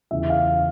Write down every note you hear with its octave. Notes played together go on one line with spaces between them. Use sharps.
E2 C#3 E3 E5
F5